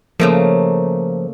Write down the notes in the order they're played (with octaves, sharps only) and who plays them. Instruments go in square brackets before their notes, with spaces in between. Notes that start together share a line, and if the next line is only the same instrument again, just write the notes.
[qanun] C#3 A3 A#3 [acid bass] F3